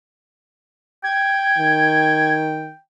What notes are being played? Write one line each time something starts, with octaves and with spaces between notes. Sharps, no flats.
G5 G#6
D#3